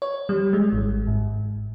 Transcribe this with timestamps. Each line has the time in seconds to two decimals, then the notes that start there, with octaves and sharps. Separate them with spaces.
0.02 C#5
0.29 G3
0.53 G#3
0.73 G#1
1.07 G#2